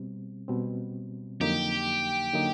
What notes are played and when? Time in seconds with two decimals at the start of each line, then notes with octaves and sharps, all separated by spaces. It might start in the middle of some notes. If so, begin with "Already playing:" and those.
Already playing: B2 G3 C4
0.48 B2 G3 C4
1.40 F2 D3 F#3 A#3 D#4 G4
2.33 D3 F#3 A#3 D#4